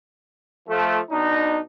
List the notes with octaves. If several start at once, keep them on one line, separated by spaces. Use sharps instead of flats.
F3 A3
B2 D4 D#4